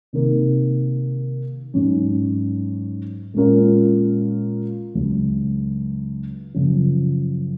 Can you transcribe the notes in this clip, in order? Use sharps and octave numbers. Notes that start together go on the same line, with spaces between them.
C3 D#3 A#3
G#2 F#3 C#4
A#2 G#3 C#4 F4 A#4
C#2 C#3 F#3
F#2 C#3 F3